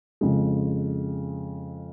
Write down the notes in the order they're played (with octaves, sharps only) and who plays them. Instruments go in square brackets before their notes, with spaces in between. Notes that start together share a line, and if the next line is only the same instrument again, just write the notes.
[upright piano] F2 C#3 G#3